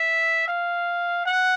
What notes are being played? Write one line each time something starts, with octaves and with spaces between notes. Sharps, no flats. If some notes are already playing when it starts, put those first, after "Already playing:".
Already playing: E5
F5
F#5